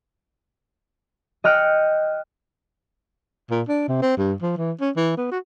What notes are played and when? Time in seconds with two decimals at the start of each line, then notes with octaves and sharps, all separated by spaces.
1.44 D#5 G5 F6 F#6 C#7 D7
3.51 A#2
3.69 D4
3.88 C3
4.02 C4
4.17 G2
4.42 F3
4.58 E3
4.81 C#4
4.96 E3
5.17 B3
5.31 F#4